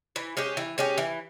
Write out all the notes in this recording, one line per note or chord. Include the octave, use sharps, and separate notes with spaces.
E3
G#3 C#4 G4
E3
G#3 C#4 G4
E3